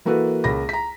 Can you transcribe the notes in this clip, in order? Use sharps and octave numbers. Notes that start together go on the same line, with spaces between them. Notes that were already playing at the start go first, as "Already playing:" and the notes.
E3 A#3 F#4 A4 B4
C#2 A#3 B5 A#6
A#5 B6